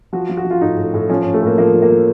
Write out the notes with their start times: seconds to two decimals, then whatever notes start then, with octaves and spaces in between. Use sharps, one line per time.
0.13 F3 F#4
0.29 F3
0.37 F#4
0.45 F3
0.51 F4
0.61 A2 D#4
0.77 A2
0.94 A2
1.09 F3 C#4
1.22 C#4
1.26 A2
1.34 A3
1.42 A2 A#3
1.58 F3 A#3
1.74 F3
1.82 A#3
1.90 F3